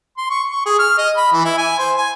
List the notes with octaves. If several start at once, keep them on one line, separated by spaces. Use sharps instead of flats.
C6
C#6
C#6
G#4
F6
D#5
B5
E3
E4
G#5
C5
G#5